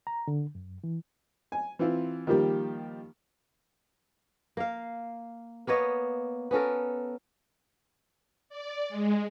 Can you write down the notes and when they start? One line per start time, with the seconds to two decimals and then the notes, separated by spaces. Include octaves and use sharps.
0.07 A#5
0.28 D3
0.55 F#2
0.84 E3
1.52 G#5
1.79 E3 C4 E4 F4
2.27 D#3 F3 G3 A#3 G4
4.57 A#3 F5
5.67 A#3 B3 C#5 D#5
6.51 B3 C#4 A4 A#4
8.49 D5
8.89 G#3